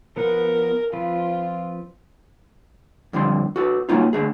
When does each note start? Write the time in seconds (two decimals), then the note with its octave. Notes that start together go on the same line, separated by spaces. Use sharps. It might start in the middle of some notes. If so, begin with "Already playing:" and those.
0.17 F3 B3 A#4 F#5
0.93 F3 C4 F4 B4
3.13 F2 D3 G3 C6
3.56 F#4 A4 B4
3.89 F#3 A#3 C#4 D#4 F4
4.13 D3 A3 G#4